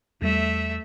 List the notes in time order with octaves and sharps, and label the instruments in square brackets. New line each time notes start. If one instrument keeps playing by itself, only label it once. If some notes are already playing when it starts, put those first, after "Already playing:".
[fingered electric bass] E2 G3 [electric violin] A3 E5